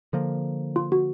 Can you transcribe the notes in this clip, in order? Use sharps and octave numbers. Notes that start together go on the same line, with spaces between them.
D3 F3 A#3
F4
F#4